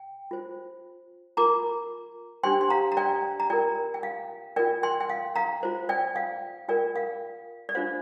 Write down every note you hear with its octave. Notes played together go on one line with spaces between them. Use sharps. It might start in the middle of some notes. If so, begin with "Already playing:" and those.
Already playing: G5
F4 C5
F4 A#4 A#5 D6
D4 G4 C5 G5 C6
C6
F5 A#5
A#5
D5 G5
A#5
F4 A#4 D5 G5
G5
F5
F4 A#4 D5 G5
G5 C6
G5
F5
F5 A#5
F4 C5
D5 G5
F5
F4 A#4 D5 G5
F5
D5
D4 F4 C5 F5